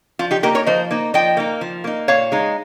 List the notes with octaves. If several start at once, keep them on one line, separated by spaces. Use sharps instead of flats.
F3 F4
D#4 G4
A#3 D#4 G4 A#4
A#4 C#5
F3 C5 D#5
A#3 D#4
F3 D#5 G5
A#3 D#4
F3
A#3 D#4
A#2 C#5 F5
G#3 D#4